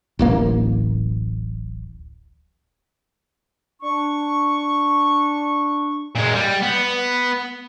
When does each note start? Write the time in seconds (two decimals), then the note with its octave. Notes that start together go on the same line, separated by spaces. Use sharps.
0.19 D1 A1 A#3
3.82 D4 C#6
6.16 A#2 G#3
6.35 G3
6.63 B3